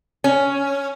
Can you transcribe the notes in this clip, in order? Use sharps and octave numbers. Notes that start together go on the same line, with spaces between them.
C#4